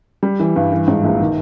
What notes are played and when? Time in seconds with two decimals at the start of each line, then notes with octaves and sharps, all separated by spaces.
0.23 G3
0.40 E3
0.56 G2
0.72 E3
0.88 G#2
1.04 A#1
1.20 D#3